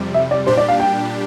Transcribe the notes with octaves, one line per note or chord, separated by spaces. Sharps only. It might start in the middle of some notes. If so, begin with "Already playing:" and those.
Already playing: F2 C3 G3
E5
D5
A#2 G3 D4 G4 C5
D5
F5
G5